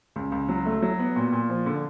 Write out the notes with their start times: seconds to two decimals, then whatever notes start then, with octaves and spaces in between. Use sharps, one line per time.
0.16 C#2
0.32 C#2
0.49 F#3
0.66 A3
0.82 F#3
0.99 B3
1.16 A#2
1.32 A#2
1.49 F3
1.66 D3